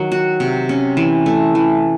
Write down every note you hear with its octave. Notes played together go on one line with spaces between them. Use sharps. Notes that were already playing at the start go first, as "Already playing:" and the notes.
Already playing: D#3 F#3
F#4
C3
C#4
E3
A3
E3